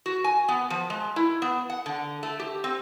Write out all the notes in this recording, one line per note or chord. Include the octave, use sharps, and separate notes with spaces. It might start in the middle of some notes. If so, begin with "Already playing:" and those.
F#4
G#5
B3
F3
G#3
E4
B3
F#5
D3
A3
G4
C4